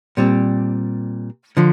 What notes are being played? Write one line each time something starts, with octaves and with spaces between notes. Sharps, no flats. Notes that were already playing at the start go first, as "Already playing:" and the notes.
A#2 G3 C4
D3 F3